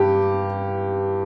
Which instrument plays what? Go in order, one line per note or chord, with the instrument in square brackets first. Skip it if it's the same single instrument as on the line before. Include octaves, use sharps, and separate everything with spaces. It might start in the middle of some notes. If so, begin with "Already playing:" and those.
Already playing: [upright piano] G2 G4